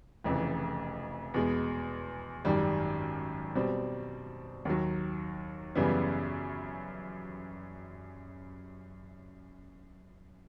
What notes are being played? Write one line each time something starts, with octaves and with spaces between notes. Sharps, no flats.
F1 F2 C#3 E3
E2 B2 G#3 B3
G#1 F#2 D#3 G3
B2 G3 C4
D#2 D#3 F#3
F#2 C#3 E3 G3 B3